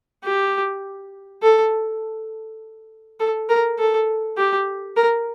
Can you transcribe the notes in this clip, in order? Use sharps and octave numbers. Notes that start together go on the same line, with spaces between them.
G4
A4
A4
A#4
A4
G4
A#4